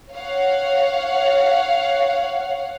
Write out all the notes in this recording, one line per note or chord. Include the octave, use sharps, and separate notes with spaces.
C#5 F5 F#5